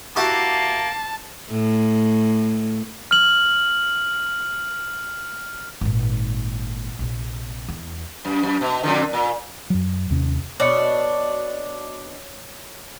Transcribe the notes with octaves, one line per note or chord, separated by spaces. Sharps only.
A#3 E4 F#4 G4 A5
A2
F6 F#7
G#1 A#2
A#1 C3
E2
F#2
F#2
B2
F2 A#2 D3
A#2
F#2 F#3
D#2 C3 C#4
B2 D4 C#5 C#7